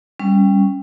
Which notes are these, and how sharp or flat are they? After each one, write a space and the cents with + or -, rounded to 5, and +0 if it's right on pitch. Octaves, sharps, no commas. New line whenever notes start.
G3 +10 C#4 +0